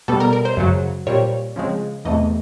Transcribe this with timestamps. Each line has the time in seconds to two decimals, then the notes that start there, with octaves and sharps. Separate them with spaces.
0.08 B2 G3 B3 A4
0.20 A#4
0.33 A#4
0.45 C5
0.57 F#2 C#3 F#3
1.07 A#2 G3 C4 C#5
1.56 C#3 F3 G#3 C4
2.05 E2 C3 E3 A3 D#5